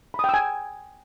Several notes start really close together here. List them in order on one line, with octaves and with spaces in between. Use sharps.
B5 D#6 G5 E6 G#5